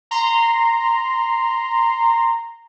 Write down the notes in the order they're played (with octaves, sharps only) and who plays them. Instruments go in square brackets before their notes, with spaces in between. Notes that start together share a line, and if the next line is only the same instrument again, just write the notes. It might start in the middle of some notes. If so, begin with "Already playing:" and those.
[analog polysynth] A#5 C6